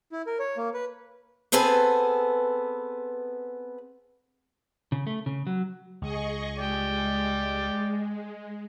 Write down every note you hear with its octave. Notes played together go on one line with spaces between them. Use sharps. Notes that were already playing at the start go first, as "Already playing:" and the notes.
E4
A#4
C#5
A#3
B4
B3 C4 G#4 A4 B4 G#5
C#3
A3
C#3
F#3
C#2 G#4 D#5 C#6
G#3 D5 G5